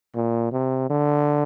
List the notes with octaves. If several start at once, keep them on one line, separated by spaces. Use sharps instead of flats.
A#2
C3
D3